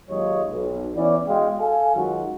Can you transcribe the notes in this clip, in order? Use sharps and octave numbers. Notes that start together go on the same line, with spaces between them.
D#2 F#3 G#3 F4 C#5 D#5
B1
E3 B3 C#4 D5
B2 G#3 F5 G5
A4 F5 G#5
F#2 D#3 F#3 G#3 F4 F#4